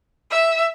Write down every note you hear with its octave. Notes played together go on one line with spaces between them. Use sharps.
E5